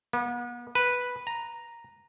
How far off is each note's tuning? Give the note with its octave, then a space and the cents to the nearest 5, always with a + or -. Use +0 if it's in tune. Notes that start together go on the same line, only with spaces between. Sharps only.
B3 -40
B4 -5
A#5 +0